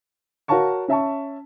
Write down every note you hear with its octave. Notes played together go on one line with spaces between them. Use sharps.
F#4 A#4 C#5 F5 A5 C#6
C#4 E5 A5 C#6